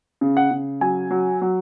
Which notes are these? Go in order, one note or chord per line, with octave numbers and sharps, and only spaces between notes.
C#3
F#5
C#3
F#3 G#5
F#3
F#3